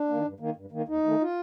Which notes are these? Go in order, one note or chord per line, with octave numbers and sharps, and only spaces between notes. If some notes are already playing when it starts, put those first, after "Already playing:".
Already playing: D4
D#3 A#3
G2
D#3 A#3
G2
D#3 A#3
D#2 D#4
D#3 A3
F4